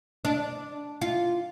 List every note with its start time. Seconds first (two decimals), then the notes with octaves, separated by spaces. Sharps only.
0.25 D4
1.01 F4